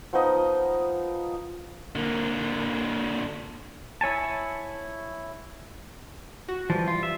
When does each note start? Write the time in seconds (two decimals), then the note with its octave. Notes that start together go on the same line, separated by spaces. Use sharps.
0.13 F3 B3 D#4 D#5
1.95 D3 A#3
4.01 E4 C#5 G#5 A5
6.49 F#4
6.70 E3 F3 G3
6.88 F4
7.03 E5